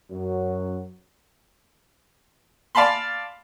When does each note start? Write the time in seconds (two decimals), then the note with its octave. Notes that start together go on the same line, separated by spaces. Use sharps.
0.11 F#2 F#3
2.75 D5 F5 A5 B5 C6